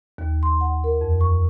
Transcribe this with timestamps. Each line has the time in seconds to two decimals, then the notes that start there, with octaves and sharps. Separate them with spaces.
0.18 D#2
0.43 C6
0.61 F#5
0.84 A#4
1.01 F2
1.21 C#6